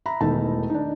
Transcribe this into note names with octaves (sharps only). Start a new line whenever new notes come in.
E5 A#5 B5
E1 D#3 A3 D#4 E4 A5
D4 D#4